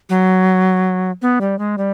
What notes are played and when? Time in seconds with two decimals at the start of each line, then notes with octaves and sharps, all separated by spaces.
0.09 F#3
1.22 B3
1.41 G3
1.59 G#3
1.78 G3